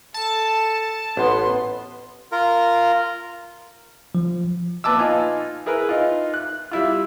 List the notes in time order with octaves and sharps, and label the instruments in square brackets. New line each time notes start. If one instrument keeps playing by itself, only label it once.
[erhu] A4 [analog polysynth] A5
[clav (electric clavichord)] A1 [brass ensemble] B3 [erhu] C6
[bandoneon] F4 A#4
[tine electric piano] F3
[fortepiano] A#2 B4 A5 D6 E6
D#4 F4 G#5
E4 G#4 A#4 B4
D#4 F4
F#6
G3 E4 F4